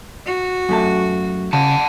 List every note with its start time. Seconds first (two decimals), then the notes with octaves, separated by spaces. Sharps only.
0.26 F#4
0.69 F#2 A3 A5
1.53 C#3 F#5 A5